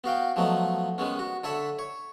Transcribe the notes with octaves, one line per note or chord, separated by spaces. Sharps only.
B3 F#4 F5 G5
F3 F#3 A3 B3 D#4
D#3 G#3 B3 C#4
F#4
D3 A4 C#5 E5 B5
C#5